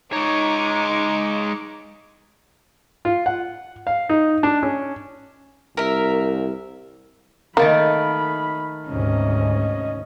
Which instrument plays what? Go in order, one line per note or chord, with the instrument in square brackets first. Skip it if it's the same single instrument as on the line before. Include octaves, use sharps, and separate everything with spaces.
[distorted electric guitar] G#3 C#5 [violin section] D#4 D6 C#7
[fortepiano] F4
F#5
F5
D#4
D4
C#4
[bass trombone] C2 [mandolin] A#4 E5
[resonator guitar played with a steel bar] D#3 A3 D#4 [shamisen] A#3 [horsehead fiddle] B5
[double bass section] D2 G#2 C3 [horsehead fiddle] C#4 D#5